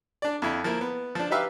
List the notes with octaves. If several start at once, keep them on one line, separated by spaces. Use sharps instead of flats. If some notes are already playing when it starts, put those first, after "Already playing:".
D4 D5
F2 E4
F3 A#3 E4
B3
F3 D4
D#4 G4 B4 E5 F5